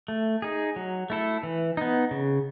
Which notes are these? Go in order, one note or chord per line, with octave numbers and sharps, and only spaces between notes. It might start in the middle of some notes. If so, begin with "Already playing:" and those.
A3
D#4 G#4
F#3
A3 E4 A4
E3
B3 D#4
C#3